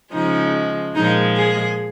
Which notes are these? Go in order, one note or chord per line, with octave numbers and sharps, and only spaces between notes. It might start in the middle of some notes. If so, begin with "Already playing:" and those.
C#3 F3 G#3 D#4
A#2 F3 G#3 D#4
G#4